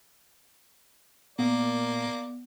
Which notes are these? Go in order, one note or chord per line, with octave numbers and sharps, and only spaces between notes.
A#2 A#3 B3 D5